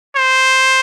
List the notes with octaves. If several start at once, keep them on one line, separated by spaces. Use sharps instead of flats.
C5